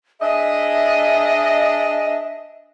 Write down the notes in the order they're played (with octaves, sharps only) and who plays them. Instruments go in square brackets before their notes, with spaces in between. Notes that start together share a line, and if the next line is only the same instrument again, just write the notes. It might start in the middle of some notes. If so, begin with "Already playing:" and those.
[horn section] D4 G#4 D#5 [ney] E5